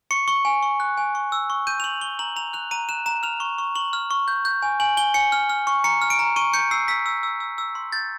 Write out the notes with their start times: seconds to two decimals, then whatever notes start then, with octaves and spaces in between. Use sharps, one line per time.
0.11 C#6 C#7
0.28 C#6
0.45 G#5
0.63 C#6
0.80 F#6
0.97 G#5
1.15 C#6
1.32 E6
1.50 C#6
1.67 G6 D#7
1.80 F7
1.84 C#6 F#7
2.01 C#6 G7
2.19 A#5 F#7
2.36 A#5 F7
2.53 F#6 F7
2.71 A#5 D#7
2.89 F#6 E7
3.06 A#5 E7
3.23 F6 F7
3.40 C#6
3.58 C#6
3.75 C#6 F#7
3.93 F6
4.11 C#6
4.28 G6
4.45 G6
4.62 G#5
4.80 G#5 F#7
4.97 G#5 G7
5.14 G#5 C#7
5.32 F6
5.50 F6
5.67 C#6
5.84 A#5 C#7
6.02 F6
6.10 D7
6.19 A#5
6.36 C#6 D#7
6.54 G6 C#7
6.71 E6 C7
6.88 E6 B6
7.06 E6
7.23 E6
7.40 E6
7.58 E6
7.75 C6
7.92 G6 A6